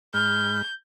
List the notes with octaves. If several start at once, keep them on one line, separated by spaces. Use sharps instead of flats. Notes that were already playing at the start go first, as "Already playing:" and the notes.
G#2 G#3 B5 F6 G6